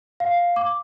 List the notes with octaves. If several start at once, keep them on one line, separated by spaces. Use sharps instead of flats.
F5
D6